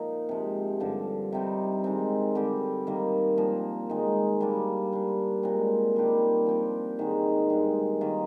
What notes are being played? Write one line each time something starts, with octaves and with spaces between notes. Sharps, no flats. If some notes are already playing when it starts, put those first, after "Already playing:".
Already playing: A#2 F3 A#3 D#4
C3 F3 G#3
G2 D3 F3
C3 G3 C4 D#4
D#3 G#3 C4
D3 G3 C4 G4
D#3 G3 A#3
A#2 F3 A#3
D#3 G#3 D#4
G3 A#3 D4
G3 A#3 D4
A#2 G#3 C4
D#3 G3 D4 G4
F3 C4 G4
G#2 D#3 G#3
G2 D#3 G#3
D#3 A#3 F4